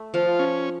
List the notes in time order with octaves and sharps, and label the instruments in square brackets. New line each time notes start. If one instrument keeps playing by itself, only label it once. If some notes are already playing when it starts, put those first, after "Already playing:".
Already playing: [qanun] A3
[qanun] F3 [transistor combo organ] F4
[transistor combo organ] C#4